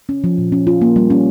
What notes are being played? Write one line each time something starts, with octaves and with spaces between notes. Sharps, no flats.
C#4
F3
A#2
C#4
F4
A#3
G3
C#4